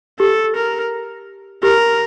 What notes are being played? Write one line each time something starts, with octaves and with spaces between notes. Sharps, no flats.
G4 A4
A#4
G4 A#4